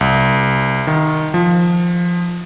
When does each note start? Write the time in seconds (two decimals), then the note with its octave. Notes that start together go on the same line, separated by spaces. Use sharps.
0.01 C2
0.87 D#3
1.34 F3